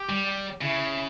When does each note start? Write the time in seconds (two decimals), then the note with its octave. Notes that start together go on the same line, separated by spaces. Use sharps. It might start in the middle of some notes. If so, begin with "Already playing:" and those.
Already playing: G4
0.09 G3
0.61 C#3 E4